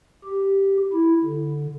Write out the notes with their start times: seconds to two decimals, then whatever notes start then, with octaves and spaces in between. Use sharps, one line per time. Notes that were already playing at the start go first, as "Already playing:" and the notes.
0.24 G4
0.93 E4
1.24 D3